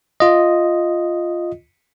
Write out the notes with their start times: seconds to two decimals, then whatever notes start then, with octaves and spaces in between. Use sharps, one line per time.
0.20 F4 D#5